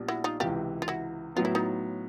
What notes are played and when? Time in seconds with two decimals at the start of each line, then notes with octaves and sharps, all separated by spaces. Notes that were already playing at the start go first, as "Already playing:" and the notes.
Already playing: A#1 A#2 G3 B3 D4
0.08 E4 F#4
0.24 D#4 F4
0.40 C#2 C3 E3 F4 G4
0.82 F4
0.88 E4 F#4
1.36 A2 F#3 B3 F4
1.45 E4
1.55 D#4 F4